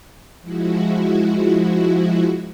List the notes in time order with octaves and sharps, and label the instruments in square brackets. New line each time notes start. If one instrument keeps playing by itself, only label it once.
[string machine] F3 G#3 E4 F#4